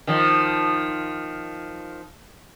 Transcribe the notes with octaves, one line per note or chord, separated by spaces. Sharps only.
D#3 F3